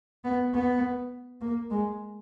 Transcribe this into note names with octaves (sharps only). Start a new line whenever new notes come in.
B3
B3
A#3
G#3